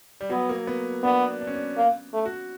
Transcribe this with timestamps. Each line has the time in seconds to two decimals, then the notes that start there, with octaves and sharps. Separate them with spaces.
0.21 G3
0.30 F#3 B3
0.49 A#3
0.67 B3
1.04 B3 D4
1.41 D4
1.47 C#4
1.55 D4
1.77 A#3
2.14 A3
2.26 F#4